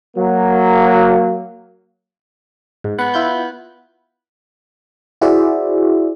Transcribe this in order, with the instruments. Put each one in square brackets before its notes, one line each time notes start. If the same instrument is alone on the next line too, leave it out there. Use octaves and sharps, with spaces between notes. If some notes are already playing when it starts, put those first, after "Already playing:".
[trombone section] F#3 A#3
[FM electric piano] G#2
[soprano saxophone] B3 [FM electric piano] F#5
[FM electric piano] E4 F4 G6
E4 F#4 G#4 C5 D5 E5